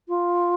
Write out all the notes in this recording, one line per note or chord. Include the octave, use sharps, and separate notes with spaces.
F4